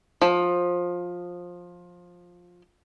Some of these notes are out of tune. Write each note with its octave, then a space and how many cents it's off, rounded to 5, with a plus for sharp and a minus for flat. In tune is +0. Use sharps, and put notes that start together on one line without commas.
F3 +15